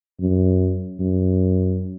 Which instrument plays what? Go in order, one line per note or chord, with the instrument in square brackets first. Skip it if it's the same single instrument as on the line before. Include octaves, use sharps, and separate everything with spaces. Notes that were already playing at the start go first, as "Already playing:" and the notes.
[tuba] F#2
F#2